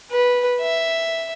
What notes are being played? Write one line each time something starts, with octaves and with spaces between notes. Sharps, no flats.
B4
E5